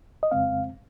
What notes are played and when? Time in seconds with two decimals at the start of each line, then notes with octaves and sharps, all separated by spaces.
0.23 D#5
0.31 F2 C#3 G#3 C4 F5